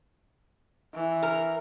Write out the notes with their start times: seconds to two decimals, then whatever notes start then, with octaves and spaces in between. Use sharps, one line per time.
0.94 E3
1.23 A#4